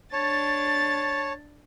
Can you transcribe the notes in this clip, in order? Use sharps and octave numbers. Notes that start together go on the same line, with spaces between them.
D4 C#5 A5 A6